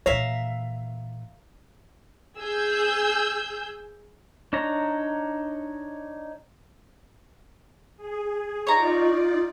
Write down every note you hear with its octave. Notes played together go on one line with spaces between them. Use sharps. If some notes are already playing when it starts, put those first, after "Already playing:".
A#2 E3 C#5 E5 F5 A#5
G#4 E6 G6
D4 D#4 C#5 A#5
G#4
D#4 F4 C#5 D5 A#5